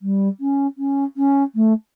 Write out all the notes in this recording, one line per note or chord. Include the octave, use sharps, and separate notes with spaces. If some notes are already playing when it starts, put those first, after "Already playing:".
G3
C#4
C#4
C#4
A3